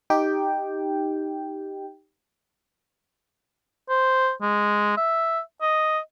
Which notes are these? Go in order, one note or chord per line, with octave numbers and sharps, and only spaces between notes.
D#4 G4 G5
C5
G#3
E5
D#5